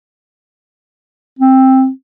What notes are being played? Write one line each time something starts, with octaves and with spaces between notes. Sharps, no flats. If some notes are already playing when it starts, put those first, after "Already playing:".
C4